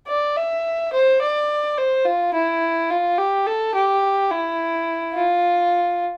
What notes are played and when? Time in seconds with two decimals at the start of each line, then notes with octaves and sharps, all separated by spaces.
0.08 D5
0.37 E5
0.93 C5
1.21 D5
1.77 C5
2.05 F4
2.34 E4
2.90 F4
3.18 G4
3.46 A4
3.75 G4
4.31 E4
5.15 F4